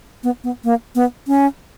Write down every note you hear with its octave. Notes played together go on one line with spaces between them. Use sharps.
B3
B3
A#3
B3
C#4